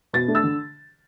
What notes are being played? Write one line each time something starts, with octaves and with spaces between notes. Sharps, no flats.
B2 A6
A3 D4
E6 A6
D3